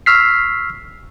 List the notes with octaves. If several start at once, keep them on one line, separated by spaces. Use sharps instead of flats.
C#6 E6 F6 B6 C7